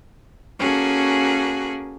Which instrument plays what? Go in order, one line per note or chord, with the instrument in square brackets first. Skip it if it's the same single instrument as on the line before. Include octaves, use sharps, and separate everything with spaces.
[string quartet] A#3 C#4 F#4 G#4 A4